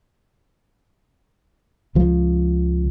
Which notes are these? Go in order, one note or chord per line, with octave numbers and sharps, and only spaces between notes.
C#2 F3